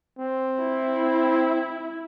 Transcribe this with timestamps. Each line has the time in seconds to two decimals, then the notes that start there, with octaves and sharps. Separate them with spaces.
0.19 C4
0.58 E4